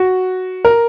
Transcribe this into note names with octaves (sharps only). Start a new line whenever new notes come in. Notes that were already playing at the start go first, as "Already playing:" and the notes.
Already playing: F#4
A#4